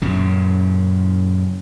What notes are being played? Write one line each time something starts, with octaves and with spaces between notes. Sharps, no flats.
F#2 A#2 C#3